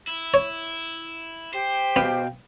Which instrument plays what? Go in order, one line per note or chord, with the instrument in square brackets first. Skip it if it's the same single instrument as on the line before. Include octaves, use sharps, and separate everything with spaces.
[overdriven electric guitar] E4
[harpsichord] C#5
[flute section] G4 [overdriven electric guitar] C5
[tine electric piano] B2 F5 G5 [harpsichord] B3